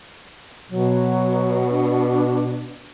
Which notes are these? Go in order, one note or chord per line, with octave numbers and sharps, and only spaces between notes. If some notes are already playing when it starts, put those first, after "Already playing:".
B2 F#3
D4